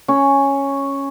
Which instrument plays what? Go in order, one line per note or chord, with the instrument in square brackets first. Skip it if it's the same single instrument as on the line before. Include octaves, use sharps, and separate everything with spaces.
[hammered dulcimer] C#4